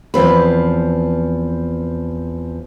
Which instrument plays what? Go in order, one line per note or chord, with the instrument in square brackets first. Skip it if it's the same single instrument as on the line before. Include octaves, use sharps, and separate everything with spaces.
[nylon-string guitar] E2 F3 C4 B4